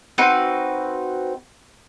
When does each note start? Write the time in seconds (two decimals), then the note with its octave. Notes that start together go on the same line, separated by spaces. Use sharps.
0.18 C4 D#4 F#4 B4